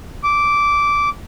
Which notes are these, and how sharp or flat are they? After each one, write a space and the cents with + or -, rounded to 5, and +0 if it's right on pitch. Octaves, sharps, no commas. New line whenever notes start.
D6 -10